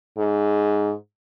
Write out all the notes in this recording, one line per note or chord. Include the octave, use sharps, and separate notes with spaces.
G#2